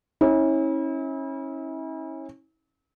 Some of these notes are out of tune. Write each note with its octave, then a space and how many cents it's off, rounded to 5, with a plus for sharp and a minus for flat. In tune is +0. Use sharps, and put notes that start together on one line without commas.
C#4 -25 E4 -40